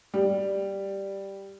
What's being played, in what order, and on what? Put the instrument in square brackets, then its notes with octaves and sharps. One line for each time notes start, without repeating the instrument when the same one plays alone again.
[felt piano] G3